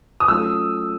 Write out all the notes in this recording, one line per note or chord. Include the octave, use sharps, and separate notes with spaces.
D#6
F#3 A3 C#4 F4 A4 E6